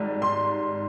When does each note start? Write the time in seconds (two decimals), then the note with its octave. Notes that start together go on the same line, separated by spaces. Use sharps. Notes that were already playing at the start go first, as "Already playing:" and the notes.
Already playing: G#1 G#2 G3 D#4
0.22 C6